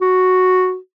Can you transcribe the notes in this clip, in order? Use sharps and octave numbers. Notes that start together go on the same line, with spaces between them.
F#4